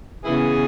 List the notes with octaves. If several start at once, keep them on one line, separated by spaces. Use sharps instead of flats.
C#3 E3 B3 E4 G#4